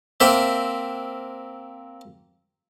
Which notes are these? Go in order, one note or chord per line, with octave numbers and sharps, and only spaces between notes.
A#3 C4 E5